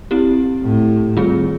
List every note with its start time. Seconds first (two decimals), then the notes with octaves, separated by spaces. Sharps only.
0.11 C4 E4 G4
0.63 A2
1.17 D#3 G3 C4 F4 G#4